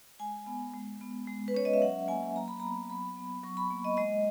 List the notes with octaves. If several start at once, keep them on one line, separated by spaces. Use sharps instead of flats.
G#3 G#5
B3
G#3
B3
G#3
B4
C#4 C#5
D#5
E5
F#3 F#5
A#3 G#5
F#3 A#5
B5
B3 A#5
F#3 B5
B3
F#3 C#6
B5
A#3
D#5
G#3 D#5